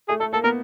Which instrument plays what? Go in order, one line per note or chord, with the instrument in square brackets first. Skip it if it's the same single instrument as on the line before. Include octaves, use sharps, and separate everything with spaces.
[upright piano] A3 [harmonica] G#4
[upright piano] A3 [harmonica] A4
[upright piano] A#3 [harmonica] A4
[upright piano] B3 [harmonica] A#4